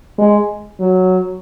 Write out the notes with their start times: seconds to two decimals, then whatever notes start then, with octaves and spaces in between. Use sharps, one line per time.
0.18 G#3
0.80 F#3